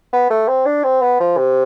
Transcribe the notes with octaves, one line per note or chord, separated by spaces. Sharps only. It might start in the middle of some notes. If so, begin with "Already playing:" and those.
B3
A3
C4
D4
C4
B3
F3
C3